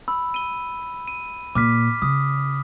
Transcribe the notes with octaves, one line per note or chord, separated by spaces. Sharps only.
B5 E6
D#7 G7
D#7
A#2 D6 F6 B6
C#3 D#6